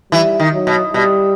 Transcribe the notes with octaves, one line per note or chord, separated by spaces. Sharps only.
E3 G3
D#3
F#3
B2
B2 G3